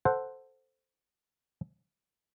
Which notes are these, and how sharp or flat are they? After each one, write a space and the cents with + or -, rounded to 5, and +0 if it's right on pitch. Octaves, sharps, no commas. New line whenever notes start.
A4 +0 C5 +0 F#5 +0